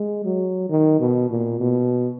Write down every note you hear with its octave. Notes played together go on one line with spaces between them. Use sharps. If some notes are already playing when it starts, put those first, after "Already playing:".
Already playing: G#3
F#3
D#3
B2
A#2
B2